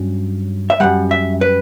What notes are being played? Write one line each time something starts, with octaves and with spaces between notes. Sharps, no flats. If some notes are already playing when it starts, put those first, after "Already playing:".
Already playing: G2 F#3 C#4
E5
F#2 C#3 G3 F#5
E5
B4